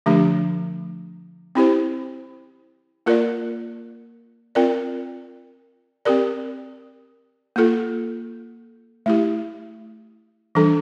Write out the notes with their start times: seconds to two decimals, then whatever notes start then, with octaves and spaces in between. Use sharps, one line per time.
0.06 D3 F3 A3 D4 G4
1.55 C4 E4 G4 C5
3.06 A#3 F4 A#4 D5
4.55 C4 F4 A#4 D5
6.05 C4 G4 A#4 D5
7.56 A#3 F4 A4
9.06 A3 E4 G4
10.55 E3 G3 D4 A4